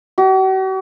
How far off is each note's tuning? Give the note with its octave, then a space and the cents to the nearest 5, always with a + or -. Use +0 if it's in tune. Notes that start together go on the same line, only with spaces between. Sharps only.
F#4 +45